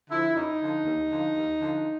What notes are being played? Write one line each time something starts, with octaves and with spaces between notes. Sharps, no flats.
D3 F3 E4
F#2 D#4
D3 F3
D#2
D3 F3
D#2
D3 F3